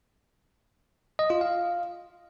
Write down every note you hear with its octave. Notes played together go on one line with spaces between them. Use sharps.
D#5
F4
F5